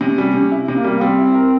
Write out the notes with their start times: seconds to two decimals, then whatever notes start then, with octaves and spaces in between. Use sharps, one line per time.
0.01 C3 C#4
0.18 G3
0.34 C3
0.52 E4
0.68 C3 A#3
0.85 G3
1.01 G3 C4
1.19 E4
1.35 A#4